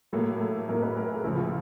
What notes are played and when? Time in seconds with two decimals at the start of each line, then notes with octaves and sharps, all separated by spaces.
0.13 A2 F#3 A#3 A4
0.40 A4
0.68 A2 F#3 A#3 A#4
0.82 B4
0.97 A#4
1.10 G#4
1.24 C#2 C#3 F3 E4
1.37 F4